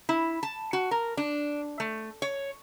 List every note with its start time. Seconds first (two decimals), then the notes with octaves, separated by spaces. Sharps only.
0.09 E4
0.43 A5
0.73 F#4
0.91 A#4
1.17 D4
1.80 A3
2.22 C#5